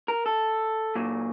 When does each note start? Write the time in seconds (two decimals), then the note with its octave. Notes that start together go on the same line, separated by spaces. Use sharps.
0.08 A#4
0.26 A4
0.95 A#2 F#3